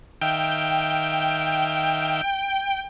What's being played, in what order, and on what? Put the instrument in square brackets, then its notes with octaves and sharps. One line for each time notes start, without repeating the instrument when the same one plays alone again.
[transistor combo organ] D#3 E5 F5 [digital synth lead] G5